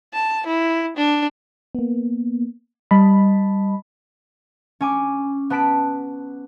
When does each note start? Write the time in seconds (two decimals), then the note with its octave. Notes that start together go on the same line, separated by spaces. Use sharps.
0.14 A5
0.46 E4
0.97 D4
1.75 A#3 B3
2.91 G3 D#5 A5 B5
4.81 C#4 G#5 D6
5.50 B3 B4 A5 B6 D7 E7